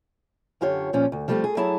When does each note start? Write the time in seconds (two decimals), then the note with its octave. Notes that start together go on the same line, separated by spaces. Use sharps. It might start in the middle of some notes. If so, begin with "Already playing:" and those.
0.61 F#2 D3 F4 G4 C#5
0.93 A#2 F3 C#4
1.12 D2
1.28 F3 G3 A3 C4 F#4 G4
1.44 G#4
1.57 F#3 E4 G#4 A5